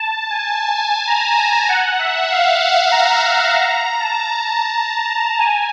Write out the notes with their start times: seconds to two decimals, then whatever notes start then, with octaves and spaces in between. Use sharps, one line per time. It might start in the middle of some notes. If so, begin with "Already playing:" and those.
Already playing: A5
0.30 G#5
0.76 G#5
1.07 A#5
1.38 A#5
1.69 F#5
1.99 E5
2.31 F5
2.62 F#5
2.91 A#5
3.22 A#5
3.53 A#5
4.00 A5
4.46 A5
5.39 G#5